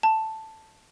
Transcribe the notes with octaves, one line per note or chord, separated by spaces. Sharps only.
A5